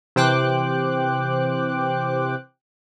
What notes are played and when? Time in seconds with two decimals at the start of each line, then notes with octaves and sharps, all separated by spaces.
0.16 C3 E3 C5 G5 D6 F#6